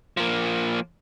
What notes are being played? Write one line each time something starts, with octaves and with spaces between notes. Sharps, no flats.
F3 A#3